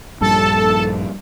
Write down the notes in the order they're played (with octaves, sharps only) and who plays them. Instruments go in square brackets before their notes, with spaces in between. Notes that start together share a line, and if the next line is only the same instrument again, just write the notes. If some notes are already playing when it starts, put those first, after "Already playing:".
[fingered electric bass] A#1 G2 G3 [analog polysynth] A4 A5